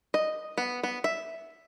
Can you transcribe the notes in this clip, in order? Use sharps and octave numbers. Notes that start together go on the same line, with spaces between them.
D#5
B3
B3
E5